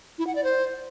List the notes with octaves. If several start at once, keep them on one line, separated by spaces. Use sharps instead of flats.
E4
F#5
D5
C5